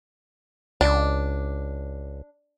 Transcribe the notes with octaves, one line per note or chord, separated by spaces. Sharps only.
C#2 D4